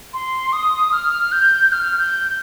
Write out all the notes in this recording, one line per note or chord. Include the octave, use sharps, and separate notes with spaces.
C6
D#6
F6
G6
F6
G6